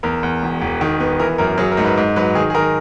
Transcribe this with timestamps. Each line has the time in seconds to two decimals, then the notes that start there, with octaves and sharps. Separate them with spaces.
0.03 E2 A#4
0.23 E2
0.42 E1
0.61 E1
0.81 D#3
1.00 B3
1.19 E3 A#4
1.38 F#2 A#4
1.58 F#3 G#4
1.72 A#4
1.77 G#2
1.84 B4
1.97 G#2
2.16 F#3 B4
2.35 D#3 G#4
2.50 G#4
2.55 D#3 A#4